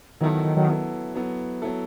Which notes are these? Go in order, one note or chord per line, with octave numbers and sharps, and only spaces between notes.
D#3 F#3 B3 E4 A4
D#3
D#3
D#3 F#3
F#3 B3 E4 A4
F#3 B3 E4 A4
F#3 B3 E4 A4